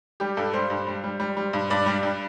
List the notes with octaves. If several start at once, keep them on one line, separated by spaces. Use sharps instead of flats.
G3 G4
G2 A4
G3 C5
G2
G3
G3
G3
G3
G2
G2 D5
G3
G2